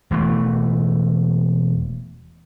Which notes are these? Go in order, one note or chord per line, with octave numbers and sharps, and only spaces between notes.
E1 E3 A3